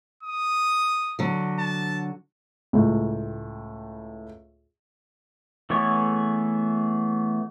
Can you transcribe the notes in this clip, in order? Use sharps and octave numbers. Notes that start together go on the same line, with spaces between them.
D#6
D3 F#3
A5
C#2 A2
E3 A3 B3 G#4 C#5